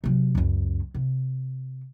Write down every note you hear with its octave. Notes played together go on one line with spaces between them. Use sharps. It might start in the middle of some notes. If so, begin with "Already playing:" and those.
C3 F#3
C#2 F#2
C3